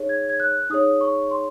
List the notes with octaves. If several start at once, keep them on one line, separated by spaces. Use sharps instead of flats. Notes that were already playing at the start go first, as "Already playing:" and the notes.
Already playing: D#4 G#4 C#5
G#6
G#6
F#6
D#4 G#4 C#5 D#6
C#6
C6